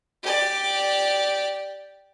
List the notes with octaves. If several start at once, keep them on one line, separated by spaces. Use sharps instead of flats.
G4 D5